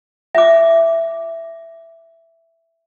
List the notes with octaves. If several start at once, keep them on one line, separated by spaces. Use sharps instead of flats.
E5 D6